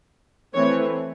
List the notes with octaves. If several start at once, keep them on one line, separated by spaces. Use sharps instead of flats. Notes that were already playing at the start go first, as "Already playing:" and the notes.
E3 A3 C4 C#5